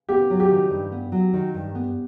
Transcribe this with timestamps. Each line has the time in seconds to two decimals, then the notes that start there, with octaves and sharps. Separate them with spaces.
0.09 B3 G4
0.30 F#3
0.40 G4
0.50 D#3
0.70 G2
0.92 B3
1.12 F#3
1.33 D#3
1.54 G2
1.75 B3